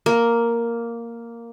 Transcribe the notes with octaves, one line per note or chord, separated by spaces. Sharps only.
A#3